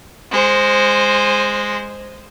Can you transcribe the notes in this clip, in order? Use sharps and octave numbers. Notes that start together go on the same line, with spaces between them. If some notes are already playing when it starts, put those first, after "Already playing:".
G#3 C5